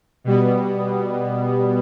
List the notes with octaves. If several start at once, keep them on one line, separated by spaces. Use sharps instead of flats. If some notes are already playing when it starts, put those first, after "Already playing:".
B2 G3 B3